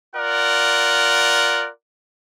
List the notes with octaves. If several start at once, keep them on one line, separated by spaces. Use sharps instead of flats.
F4 A#4 D5 F#5